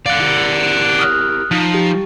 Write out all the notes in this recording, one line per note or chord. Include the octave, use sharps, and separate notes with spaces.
F#2 A3 D5 F5 F#5
E4 G4 A#4
D#6 F6 F#6
F3 D#4
G4